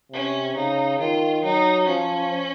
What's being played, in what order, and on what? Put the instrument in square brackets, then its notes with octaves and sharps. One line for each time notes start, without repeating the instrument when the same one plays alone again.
[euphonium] C3 [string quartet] C#4
[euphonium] C#3 [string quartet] D#4
[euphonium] D#3 [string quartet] F4
[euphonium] F#3 [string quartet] D#4
[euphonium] F3 [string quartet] C#4